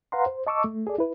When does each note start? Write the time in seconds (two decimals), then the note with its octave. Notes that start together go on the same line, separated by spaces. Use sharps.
0.12 B4 F5 F#5 A#5 C6
0.26 C5
0.47 D#5 A5 C#6 D6 E6
0.64 A3
0.87 G#4 A4 D5
0.98 E4 B4